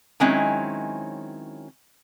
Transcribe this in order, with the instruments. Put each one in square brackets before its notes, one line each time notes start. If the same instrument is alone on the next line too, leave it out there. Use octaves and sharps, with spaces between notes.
[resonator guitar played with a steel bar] D#3 F#3 G#3 C4 C#4 E4